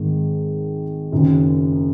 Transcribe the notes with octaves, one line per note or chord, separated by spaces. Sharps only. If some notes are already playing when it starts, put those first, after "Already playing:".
Already playing: G#1 G#2 D#3 G#3
F#1 F#2 D#3